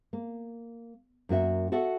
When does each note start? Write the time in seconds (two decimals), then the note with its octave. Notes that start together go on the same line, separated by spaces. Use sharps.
0.13 A#3
1.29 F#2 A#3 F#4 E5
1.72 F#4 A4 E5 F#5